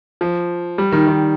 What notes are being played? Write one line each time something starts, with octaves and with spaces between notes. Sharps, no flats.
F3
G3
D#3
D#3